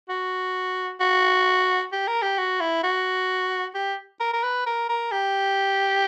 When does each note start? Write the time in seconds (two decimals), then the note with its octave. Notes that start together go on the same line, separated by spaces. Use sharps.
0.09 F#4
1.00 F#4
1.92 G4
2.07 A#4
2.22 G4
2.38 F#4
2.60 E4
2.83 F#4
3.74 G4
4.20 A#4
4.33 A#4
4.43 B4
4.66 A#4
4.89 A#4
5.12 G4